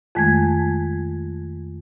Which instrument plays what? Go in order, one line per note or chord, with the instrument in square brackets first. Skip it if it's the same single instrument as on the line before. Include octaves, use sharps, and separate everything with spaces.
[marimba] F2 D#3 G#3 A3 G#6